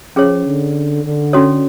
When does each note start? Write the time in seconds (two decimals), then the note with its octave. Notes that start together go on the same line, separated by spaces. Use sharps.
0.16 F3 C#4 G#4 C#5
0.46 D3
1.04 D3
1.33 C#4 F#4 A4 C#5